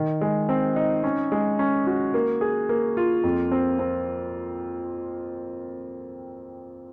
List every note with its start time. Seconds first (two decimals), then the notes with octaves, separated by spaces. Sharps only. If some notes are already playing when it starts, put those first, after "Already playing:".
Already playing: D#3
0.21 G#3
0.49 C4
0.76 D#4
1.04 C#4
1.32 G#3
1.59 C#4
1.87 F#4
2.14 A#3
2.41 G#4
2.69 A#3
2.97 F4
3.24 F2
3.52 C4
3.79 C4